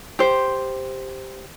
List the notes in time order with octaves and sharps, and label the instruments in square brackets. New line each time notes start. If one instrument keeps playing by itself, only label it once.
[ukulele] G4 C5